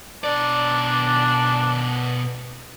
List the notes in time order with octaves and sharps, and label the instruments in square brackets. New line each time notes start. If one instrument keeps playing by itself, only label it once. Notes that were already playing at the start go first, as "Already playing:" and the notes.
[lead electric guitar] B2 D5 [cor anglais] D4